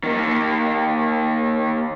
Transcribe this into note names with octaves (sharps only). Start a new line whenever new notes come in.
D#3 A#3